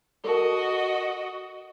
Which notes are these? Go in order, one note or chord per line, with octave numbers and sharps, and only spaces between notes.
F#4 A4 A#4 D#5 A5